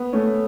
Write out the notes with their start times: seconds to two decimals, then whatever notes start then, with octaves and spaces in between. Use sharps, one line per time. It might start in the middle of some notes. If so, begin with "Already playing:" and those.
Already playing: B3
0.13 A3 C#4